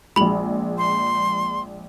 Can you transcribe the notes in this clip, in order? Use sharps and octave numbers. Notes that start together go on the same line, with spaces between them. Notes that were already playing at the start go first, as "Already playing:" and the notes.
A#1 G#3 B5 F#7
C6